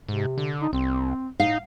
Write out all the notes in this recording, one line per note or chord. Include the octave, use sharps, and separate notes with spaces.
G#2 C3
D3
D#4
C2 C4
A2 D#4 F5